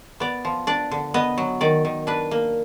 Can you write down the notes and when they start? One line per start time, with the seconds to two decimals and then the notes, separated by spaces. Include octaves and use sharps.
0.20 B3 D5
0.45 F3
0.67 D4 D5
0.91 D3
1.14 B3 D#5
1.38 F#3
1.61 D#3 D5
1.85 D#3
2.07 D4 B4
2.31 A#3